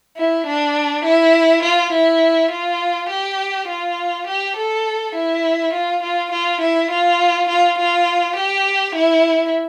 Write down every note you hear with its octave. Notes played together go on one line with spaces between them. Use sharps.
E4
D4
E4
F4
E4
F4
G4
F4
G4
A4
E4
F4
F4
F4
E4
F4
F4
F4
G4
E4